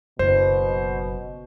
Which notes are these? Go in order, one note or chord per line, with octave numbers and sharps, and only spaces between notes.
F#1 B2 C5